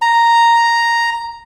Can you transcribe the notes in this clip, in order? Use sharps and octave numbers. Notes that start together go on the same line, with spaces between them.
A#5